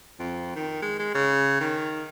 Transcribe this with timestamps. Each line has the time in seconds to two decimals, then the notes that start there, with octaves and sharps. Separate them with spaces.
0.19 F2
0.55 D#3
0.82 G#3
0.99 G#3
1.14 C#3
1.60 D#3